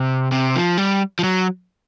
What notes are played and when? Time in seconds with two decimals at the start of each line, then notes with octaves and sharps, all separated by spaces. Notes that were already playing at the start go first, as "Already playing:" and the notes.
Already playing: C3
0.32 C3
0.55 F3
0.78 G3
1.19 F3
1.24 F#3